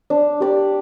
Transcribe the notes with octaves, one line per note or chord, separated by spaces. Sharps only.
D4
G4 D5